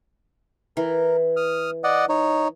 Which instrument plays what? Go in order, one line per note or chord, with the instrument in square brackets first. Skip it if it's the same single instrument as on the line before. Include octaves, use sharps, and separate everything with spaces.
[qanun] E3 [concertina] A#4
[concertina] D#6 F6
D5 D#5 F#5
D#4 C#5